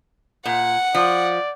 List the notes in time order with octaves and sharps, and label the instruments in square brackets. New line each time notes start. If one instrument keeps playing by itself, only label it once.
[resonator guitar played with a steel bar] A#2 [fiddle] F#5
[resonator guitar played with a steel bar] F3 [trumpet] D5